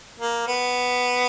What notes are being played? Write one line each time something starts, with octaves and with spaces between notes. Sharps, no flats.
A#3
B3